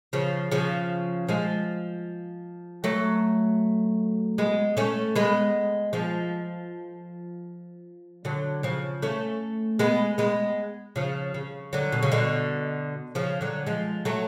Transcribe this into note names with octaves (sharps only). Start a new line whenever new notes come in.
C#3 F3
C#3 F3
F3 G#3
F#3 A3
G#3 B3
A3 C#4
G#3 B3
F3 G#3
D3 F#3
C#3 F3
A3 C#4
G#3 B3
G#3 B3
C#3 F3
C#3
D3 F#3
B2
C#3
B2 D3
C#3 F3
D3 F#3
F3 G#3
F#3 A3